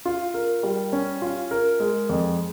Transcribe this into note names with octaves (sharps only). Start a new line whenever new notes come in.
F4
A#4
G3
C#4
F4
A#4
G#3
F2